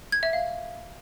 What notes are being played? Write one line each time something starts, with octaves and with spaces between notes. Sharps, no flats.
G#6
E5
F5